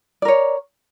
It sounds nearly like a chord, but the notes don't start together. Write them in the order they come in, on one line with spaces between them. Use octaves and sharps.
D5 A#4 C#5